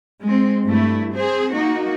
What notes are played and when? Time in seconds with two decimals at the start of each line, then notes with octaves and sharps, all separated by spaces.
0.24 G#3 C4
0.65 G2 A3 E4
1.12 C4 G#4 C5
1.53 A#3 D#4 F#4